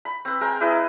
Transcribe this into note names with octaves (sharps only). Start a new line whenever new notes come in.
B5
C4 B4
G#3 A#4 C5 G5
E4 G#4 B4 D#5